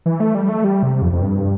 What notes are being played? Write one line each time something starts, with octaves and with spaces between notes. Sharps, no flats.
E3
A3
G3
A3
G3
C3
F2
F2
G2